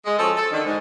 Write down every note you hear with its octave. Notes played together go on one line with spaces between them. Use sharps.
G#3
F3 C#4 F#4 A4
A4
D3 D#3
G#2